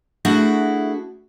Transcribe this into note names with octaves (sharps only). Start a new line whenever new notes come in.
A3 D4 E4 F#4 G#4 F#5